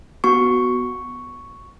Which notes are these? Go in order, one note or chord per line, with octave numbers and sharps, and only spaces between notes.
B3 F#4 C#6